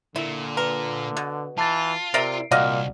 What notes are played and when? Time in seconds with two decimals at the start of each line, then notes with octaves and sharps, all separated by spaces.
0.16 A#2 D3 E4
0.57 A#4 B4
1.17 B2
1.58 E3 F4 A5 A6
2.14 C3 A#4 D5 E5 C7 D7
2.51 C2 A#2 F#4 D5 D#5 F5 F6